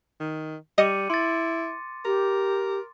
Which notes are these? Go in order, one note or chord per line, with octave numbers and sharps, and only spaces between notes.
D#3
G3 D#5 D6 C#7 D#7
E4 C6 A6
G4 A#4